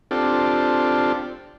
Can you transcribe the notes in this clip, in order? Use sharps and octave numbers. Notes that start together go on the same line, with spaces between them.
C4 D4 F4 G4 A4